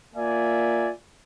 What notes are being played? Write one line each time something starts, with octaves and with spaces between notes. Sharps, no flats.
A#3 F4 A#4 D5 E5 G#5